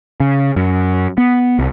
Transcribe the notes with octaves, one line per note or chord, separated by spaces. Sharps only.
C#3
F#2
B3
C2